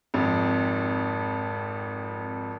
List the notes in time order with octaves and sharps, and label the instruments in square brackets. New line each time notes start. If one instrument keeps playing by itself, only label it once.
[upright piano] G#1 F2